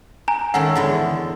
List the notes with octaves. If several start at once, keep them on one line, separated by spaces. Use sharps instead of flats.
G#5 A#5
D#3 A3 C#4 F#5
E2 D3 G#3